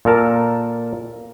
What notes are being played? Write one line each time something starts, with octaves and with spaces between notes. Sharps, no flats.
A#2 A4 A#4 A5